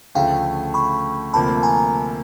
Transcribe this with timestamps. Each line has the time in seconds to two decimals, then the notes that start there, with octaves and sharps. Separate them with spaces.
0.15 D2 C#3 F3 A3 F5 G5
0.74 B5 C#6
1.34 D2 C3 F3 A#3 A5 B5
1.63 G#5 A#5